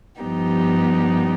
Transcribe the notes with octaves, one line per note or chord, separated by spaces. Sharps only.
G2 F3 B3 D#4 G4